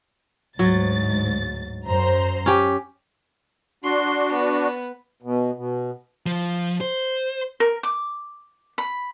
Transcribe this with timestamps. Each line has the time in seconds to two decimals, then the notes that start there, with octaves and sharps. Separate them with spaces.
0.59 D2 G#2 F#3 A6
1.87 F#2 C5 A#5
2.46 C#4 G4
3.84 D4 F#4 C6
4.33 B3
5.22 B2
5.55 B2
6.27 F3
6.81 C5
7.60 A#4
7.83 D6
8.78 B5